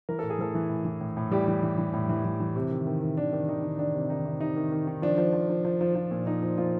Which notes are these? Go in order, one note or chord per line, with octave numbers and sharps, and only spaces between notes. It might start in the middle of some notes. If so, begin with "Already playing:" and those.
E3 A#4
A2 A4
G#4
E3 A3 A4
E3
A2
E3
A2
A2
E3 G3 G4
E3
E3
E3
A2
E3
E3
E3
C3
D#3
D#3
D#3
D#3 D4
D#3
D#3 D#4
D#3
D#3 D4
C3
D#3 D#4
C3
C3 D#4
D#3
D#3
D#3
F3 D4
F3
F3
F3
F3
F3
F3
A#2
F3 D#4
F3
A#2 F3 F4